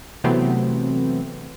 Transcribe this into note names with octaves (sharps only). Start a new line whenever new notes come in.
C3 E3 F#3 A3 B3 C4